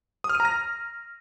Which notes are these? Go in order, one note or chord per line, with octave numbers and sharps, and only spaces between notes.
D#6
F6
D#7
A#5
A#6